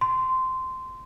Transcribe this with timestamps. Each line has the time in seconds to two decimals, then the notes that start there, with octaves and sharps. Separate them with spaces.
0.01 C6